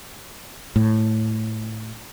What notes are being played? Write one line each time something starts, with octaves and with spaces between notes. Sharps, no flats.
A2